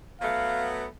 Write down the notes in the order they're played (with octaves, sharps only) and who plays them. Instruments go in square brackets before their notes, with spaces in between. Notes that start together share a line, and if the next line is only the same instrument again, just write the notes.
[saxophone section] F#3 A3 B3 [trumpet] F5